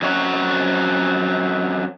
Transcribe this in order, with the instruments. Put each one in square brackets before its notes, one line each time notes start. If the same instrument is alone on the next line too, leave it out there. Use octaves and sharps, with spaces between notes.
[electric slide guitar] F2 F#3 C#4 C#5 F#5